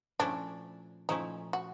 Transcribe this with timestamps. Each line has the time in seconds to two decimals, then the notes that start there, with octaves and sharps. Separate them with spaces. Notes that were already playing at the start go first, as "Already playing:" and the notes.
0.19 A#2 F3 A3 C#4 D4 E4
1.09 A#2 F3 A3 C#4 D#4 E4
1.53 F#4